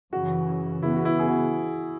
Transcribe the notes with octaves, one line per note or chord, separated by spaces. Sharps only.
F#2 C#3 E3 F#4
C#3 E3 B3 E4
F#4
E4
G#4
F#4